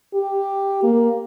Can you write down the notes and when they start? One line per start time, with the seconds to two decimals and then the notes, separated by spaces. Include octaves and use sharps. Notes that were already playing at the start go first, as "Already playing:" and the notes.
0.14 G4
0.83 A#3